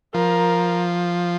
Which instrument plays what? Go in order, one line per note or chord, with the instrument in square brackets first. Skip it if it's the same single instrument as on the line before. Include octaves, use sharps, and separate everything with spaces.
[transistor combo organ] F3 [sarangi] A#4